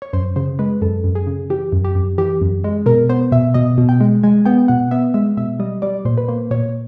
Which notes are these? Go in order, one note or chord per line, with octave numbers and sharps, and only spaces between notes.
C#5
F#2 C5
C#3 C5
G#3 B4
F#2 A4
F#2
G#4
C#3
E3 G4
F#2
G4
F#2
E3 G4
F#2
G#3
B2 A#4
B3 C5
B2 E5
B2 D#5
B2
G5
G#3
G#3 G#5
B3 G5
B2 F#5
B3 E5
G#3 E5
B2 E5
G3 D#5
G3 D5
A#2 C5
B4
A#3 C5
A#2 C#5